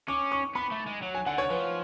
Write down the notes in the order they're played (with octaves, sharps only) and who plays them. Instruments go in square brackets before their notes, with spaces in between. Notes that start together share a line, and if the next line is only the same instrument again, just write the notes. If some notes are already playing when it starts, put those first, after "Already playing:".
[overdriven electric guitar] C#4 [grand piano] D6
[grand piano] C#6
[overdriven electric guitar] B3 [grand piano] B5
[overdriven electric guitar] A3
G#3
F#3
[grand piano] G#5
[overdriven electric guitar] D3 [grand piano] F#5
[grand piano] C#5
[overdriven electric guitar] F3 [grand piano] B4